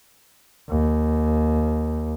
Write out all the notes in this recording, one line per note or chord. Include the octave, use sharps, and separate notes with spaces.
D#2